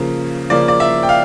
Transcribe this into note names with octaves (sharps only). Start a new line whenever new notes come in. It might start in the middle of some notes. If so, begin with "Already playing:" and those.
Already playing: C#3 F3 A#3
C#3 F3 A#3 D5
D5
E5
G5
F5